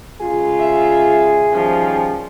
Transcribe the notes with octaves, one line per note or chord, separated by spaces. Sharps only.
C#3 G#3 F4 G#4
E5
D#3 F3 G3 C#4